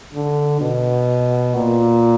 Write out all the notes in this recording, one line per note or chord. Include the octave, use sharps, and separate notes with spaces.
D3
B2
A#2